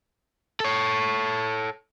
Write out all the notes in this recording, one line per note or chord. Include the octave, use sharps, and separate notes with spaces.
A4 C#5